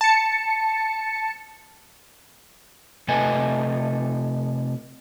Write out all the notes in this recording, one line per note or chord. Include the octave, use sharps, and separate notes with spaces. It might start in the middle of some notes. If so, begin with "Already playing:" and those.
A5 C#7
C3 A3 A4 B4 D#5 G#5